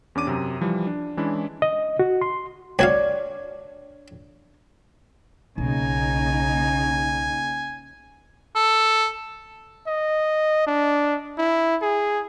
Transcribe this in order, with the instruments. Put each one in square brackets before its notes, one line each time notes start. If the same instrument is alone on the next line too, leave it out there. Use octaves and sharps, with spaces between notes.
[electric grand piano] E2 C#4 D4 D6 D#7
F#2 C3
E3 F3 G3
D4
E3 G#3 C#4 D4 E4
[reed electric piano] D#5
F#4
C6
[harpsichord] C2 F#4 F5 [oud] D4 [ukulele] C#5
[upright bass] B1 [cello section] C#3 A#3 D#4 [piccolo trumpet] G#5
[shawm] A4
[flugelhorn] D#5
D4
E4
G#4